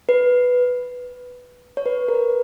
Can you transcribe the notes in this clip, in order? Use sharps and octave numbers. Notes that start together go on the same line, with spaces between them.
B4
C#5
B4
A#4
B4